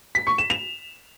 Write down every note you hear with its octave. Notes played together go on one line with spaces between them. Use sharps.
B6
C#6
E7
F7